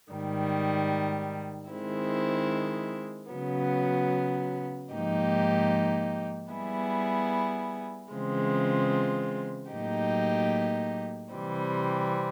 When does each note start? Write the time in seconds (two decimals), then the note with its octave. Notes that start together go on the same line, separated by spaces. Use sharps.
0.11 G#2 D#3 G3
1.71 D#3 G#3 C4 E4
3.31 C#3 F#3 B3
4.92 G#2 F3 A#3 D#4 G4
6.51 G3 B3 E4 G#4
8.12 C#3 E3 G#3 C4 F4
9.72 A2 F#3 A#3 D#4 G4
11.32 C3 E3 G3 C4